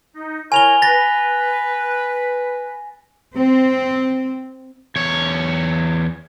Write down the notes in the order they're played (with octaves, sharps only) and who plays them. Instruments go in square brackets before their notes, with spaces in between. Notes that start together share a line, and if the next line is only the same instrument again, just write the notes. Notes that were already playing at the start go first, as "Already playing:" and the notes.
[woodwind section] D#4
[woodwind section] E4 A#4 C#5 [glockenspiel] G#5 F7 G7
[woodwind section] B4 [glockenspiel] A6 A#6
[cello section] C4
[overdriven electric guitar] E2 C#5